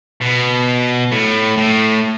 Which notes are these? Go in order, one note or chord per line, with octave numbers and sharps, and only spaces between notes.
B2
A2
A2